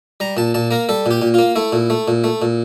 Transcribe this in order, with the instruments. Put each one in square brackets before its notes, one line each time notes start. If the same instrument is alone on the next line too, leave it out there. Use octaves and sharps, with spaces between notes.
[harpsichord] G3 A#5
A#2 A5
A#2 A5
A#3 A#4
G3 A4
A#2 G4
A#2
A#3 F4
A3 E4
A#2
A3
A#2
A3
A#2